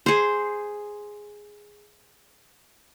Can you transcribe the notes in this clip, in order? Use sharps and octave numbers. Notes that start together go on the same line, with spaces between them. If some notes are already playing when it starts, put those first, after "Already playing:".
G#4 C5